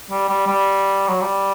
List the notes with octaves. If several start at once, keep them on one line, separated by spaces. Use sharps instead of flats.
G3
G3
G3
F#3
G3